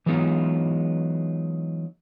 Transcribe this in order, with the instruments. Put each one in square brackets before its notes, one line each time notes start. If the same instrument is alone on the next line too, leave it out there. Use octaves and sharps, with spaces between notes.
[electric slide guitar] E3 F#3 G#3 B3 D#4 F4